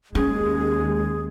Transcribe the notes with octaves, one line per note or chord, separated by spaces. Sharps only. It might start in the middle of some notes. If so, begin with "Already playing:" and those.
D#2 G#3 C#4 G#4